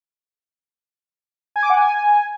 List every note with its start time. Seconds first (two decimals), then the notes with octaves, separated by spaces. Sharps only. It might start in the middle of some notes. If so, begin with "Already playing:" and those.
1.56 G#5
1.63 D6
1.70 F#5
1.77 G#5